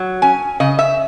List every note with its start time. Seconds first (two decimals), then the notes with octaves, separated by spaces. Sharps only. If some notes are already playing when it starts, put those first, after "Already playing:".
Already playing: F#3
0.22 C#4 G#5
0.60 C#3 D#5
0.79 E5